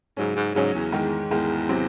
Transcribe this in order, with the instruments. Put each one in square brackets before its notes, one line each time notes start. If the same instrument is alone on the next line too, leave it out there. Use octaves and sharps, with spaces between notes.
[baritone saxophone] G#2 [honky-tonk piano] C#3 F#3 C#4
[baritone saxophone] G#2
[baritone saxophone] G#2 [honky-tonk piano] C#3 F#3 C#4
[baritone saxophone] E2
[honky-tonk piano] G#2 D#3 G#3
[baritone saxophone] E2 [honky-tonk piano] G#2 D#3 G#3
[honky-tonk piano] C3 F#3 C4